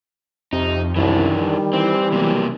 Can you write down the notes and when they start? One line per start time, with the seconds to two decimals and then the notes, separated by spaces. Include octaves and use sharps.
0.53 F2 C3 D#4
0.96 C2 F#2 D#3 E3 D4
1.42 G3
1.73 E3 C4
2.12 B1 C3 A#3